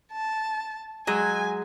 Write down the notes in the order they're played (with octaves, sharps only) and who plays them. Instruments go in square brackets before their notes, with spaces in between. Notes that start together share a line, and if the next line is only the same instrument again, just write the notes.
[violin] A5
[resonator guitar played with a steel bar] F#3 G#3 [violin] G#5